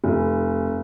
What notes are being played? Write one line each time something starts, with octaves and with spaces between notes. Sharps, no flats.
F1